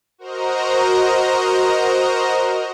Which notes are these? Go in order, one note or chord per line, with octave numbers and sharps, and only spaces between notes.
F#4 A#4 C5 D#5 A#5